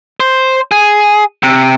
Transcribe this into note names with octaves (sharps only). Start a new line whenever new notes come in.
C5
G#4
C3